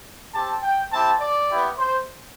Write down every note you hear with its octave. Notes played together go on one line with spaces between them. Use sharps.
C4 G4 A5
G5
C4 E4 G4 A5
D5
B3 E4 G4
C5